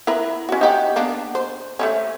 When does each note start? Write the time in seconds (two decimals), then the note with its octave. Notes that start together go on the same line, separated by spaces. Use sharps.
0.07 E4 A#4 B4
0.49 C#4 F#4
0.61 D#4 G4 F#5
0.96 A#3 B3 D4
1.35 C5
1.79 A3 A#3 C#4